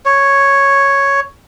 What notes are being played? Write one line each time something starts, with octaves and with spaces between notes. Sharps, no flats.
C#5